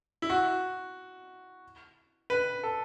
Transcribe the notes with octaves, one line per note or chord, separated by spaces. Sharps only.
E4
F#4
B4
A4